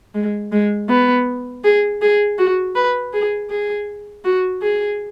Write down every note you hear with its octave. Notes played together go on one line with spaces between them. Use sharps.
G#3
G#3
B3
G#4
G#4
F#4
B4
G#4
G#4
F#4
G#4